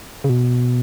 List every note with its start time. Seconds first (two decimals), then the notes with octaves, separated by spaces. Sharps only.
0.24 C#3
0.29 B2